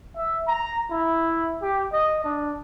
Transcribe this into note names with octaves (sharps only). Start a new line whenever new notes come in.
E5
A#5
E4
G4
D#5
D4